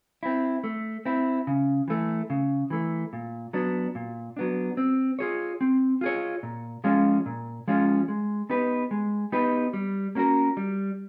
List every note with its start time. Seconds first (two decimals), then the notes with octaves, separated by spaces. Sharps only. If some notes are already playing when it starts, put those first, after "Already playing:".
0.23 C4 E4
0.64 A3
1.05 C4 E4
1.47 C#3
1.88 E3 A3
2.30 C#3
2.70 E3 A3
3.13 A#2
3.53 F#3 B3 D4
3.95 A#2
4.37 F#3 B3 D4
4.77 C4
5.19 F4 G#4 C#5
5.61 C4
6.01 F4 G#4 C#5
6.43 A#2
6.84 F3 G#3 C#4 F4
7.26 A#2
7.68 F3 G#3 C#4 F4
8.08 G#3
8.50 B3 D#4 G4 B4
8.91 G#3
9.32 B3 D#4 G4 B4
9.73 G3
10.15 A#3 C#4 F#4 A#4
10.57 G3